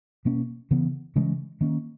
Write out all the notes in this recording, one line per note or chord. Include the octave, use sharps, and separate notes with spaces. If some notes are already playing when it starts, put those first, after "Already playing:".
B2 A#3 C#4
C#3 E3 B3
C#3 E3 G#3 C#4
D#3 A#3 C#4